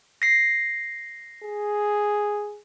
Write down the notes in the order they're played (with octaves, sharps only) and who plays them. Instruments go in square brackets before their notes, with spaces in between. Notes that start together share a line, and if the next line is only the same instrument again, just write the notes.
[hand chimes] A#6 C7
[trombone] G#4